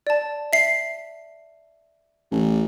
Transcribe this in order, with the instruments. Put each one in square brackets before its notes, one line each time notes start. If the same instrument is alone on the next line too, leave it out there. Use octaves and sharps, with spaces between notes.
[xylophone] D5 A5
E5 C7
[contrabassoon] A1